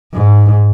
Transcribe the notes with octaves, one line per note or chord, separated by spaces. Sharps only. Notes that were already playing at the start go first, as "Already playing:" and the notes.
G#2